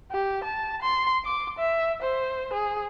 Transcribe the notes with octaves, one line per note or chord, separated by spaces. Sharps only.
G4
A5
C6
D6
E5
C5
G#4